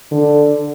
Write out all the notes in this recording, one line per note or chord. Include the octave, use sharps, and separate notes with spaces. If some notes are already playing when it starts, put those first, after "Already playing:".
D3